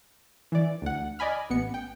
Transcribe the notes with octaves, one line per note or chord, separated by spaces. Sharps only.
E3 D5
D2 F#5
D5 D#5 G#5 B5 F6
A1 B3 C#7
G5